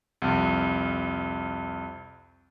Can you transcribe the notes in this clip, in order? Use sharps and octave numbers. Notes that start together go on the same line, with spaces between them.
C2 F2